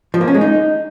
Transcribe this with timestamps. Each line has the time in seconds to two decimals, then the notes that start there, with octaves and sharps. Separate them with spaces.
0.14 F3
0.21 A#3
0.28 C#4
0.34 G#3
0.41 D#4